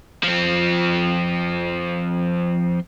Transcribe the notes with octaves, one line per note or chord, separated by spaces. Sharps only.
F3 C4